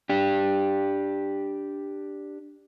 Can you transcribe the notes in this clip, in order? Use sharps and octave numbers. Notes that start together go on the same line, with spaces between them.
D4 G4